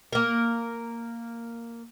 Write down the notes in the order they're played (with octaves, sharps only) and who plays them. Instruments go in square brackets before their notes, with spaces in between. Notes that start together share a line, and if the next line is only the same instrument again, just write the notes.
[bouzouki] A#3 A#4